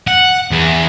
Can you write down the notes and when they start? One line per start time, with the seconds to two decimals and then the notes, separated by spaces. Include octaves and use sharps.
0.08 F#5
0.52 E2